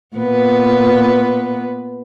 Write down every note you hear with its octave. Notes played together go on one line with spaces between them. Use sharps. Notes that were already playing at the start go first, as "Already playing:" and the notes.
A#2 B3 B4